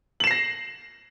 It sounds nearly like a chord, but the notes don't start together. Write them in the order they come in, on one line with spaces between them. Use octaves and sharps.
F#7 E7 C7 A#6